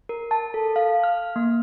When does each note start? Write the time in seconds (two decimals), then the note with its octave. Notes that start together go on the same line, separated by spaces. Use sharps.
0.09 A#4
0.31 A5
0.54 A4
0.76 F5
1.04 F6
1.36 A#3